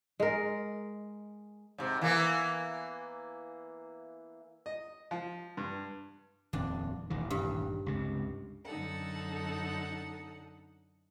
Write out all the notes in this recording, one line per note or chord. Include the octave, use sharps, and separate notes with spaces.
G#3 A#4
G#2 C3
E3 A#3 B3
D#5
F3
G2
D#1 F2 D4
D#1 A1 D#3
G2
C#2 C3
F#2 D3 D#4 A4 F#5